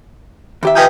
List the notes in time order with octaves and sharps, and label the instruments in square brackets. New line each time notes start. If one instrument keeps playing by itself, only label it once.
[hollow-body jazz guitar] D#2 G4 E5
[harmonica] F3 D#4 G#5 [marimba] B4 G5 G6